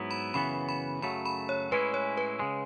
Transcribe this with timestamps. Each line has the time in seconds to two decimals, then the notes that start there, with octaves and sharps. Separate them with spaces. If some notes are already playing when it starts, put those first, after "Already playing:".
Already playing: G#2 F#3 B3 E4
0.11 B5
0.34 F#2 C#3 E3 B3 B5
0.69 B5
1.02 F#2 C#3 F#3 A3 B5
1.25 B5
1.49 C#5
1.71 A2 G#3 C#4 E4 B4
1.94 C#5
2.17 B4
2.39 C#3 G#3